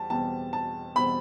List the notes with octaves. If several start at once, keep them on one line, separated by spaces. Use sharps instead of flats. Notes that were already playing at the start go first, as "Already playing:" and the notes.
Already playing: E2 G3 A5
E2 B2 G3 C4 A5
A5
E2 B2 G3 C4 B5